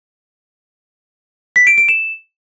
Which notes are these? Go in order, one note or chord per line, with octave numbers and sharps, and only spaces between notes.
B6
D7
D7
E7